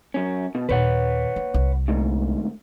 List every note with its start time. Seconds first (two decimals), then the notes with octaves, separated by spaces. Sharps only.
0.14 F#2 C#4
0.55 B2
0.69 D#2 A#2 B4 C#5 F#5
1.36 A#3
1.54 C2 F4
1.88 D2 G#2